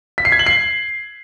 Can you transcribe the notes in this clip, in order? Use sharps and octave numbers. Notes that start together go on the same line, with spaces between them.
B6
C7
G#6
F#7
C7